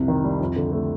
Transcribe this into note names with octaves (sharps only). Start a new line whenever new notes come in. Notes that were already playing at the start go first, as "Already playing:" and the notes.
Already playing: C2 F2 C3
D#3
G3
F2
D3
A3